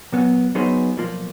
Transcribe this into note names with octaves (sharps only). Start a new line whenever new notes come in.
A#2 F#3 B3
F#3 B3 D#4 G#4 C5
B1 A#2 F3 A#3